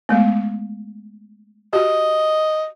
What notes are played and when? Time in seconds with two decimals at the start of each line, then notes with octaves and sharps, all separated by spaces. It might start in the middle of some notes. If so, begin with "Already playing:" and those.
0.09 G#3 A3 B3
1.73 F#4 G4 D#5